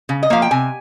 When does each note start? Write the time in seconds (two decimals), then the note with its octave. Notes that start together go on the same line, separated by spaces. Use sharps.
0.09 C#3
0.23 D#5
0.30 F3 A#3 F5
0.42 G5
0.51 C3 G#5